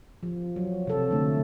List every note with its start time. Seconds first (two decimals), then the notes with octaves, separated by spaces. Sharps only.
0.23 F3
0.56 F#3
0.87 C3 A4
1.11 D3 A3